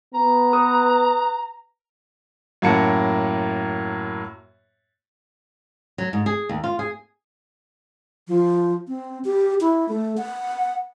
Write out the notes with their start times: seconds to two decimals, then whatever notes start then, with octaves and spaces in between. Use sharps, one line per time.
0.14 B3 A#5
0.53 B4 D#6
2.62 F#2 A2 A#3 F#5 A5 C#7
5.98 F#3
6.13 G#2
6.26 G#4
6.49 D#2
6.64 F4
6.79 G#4
8.28 F3
8.88 C4
9.25 G4
9.61 E4
9.89 A3
10.17 F#5